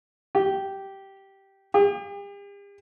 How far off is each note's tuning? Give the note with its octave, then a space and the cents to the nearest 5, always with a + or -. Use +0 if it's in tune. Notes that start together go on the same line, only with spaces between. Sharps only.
G4 -10
G4 +45